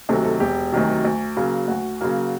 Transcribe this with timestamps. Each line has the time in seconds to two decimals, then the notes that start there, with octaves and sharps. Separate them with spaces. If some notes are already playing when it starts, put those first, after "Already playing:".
0.09 D2 C3 D#3 F#3 A4
0.25 A4
0.40 E1 G4
0.72 D2 C3 D#3 F#3
1.05 D2
1.37 C#3 F#3 A#3
1.68 D2 F#4
2.01 C#3 F#3 A#3